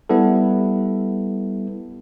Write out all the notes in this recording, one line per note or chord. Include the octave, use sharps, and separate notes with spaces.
G3 B3 E4 A4